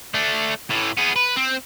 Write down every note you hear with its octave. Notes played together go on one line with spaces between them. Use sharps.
A3 D4
A2 E3
B3 G#4
B4
C4